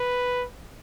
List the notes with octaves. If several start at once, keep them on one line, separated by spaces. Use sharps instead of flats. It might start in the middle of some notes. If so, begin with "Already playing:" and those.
Already playing: B4